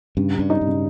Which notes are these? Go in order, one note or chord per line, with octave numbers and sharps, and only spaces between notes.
G2 C#3
G3
G2
D#4
G2
C#3